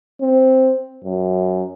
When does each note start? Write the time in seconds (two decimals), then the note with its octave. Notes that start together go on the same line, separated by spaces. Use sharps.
0.21 C4
1.05 F#2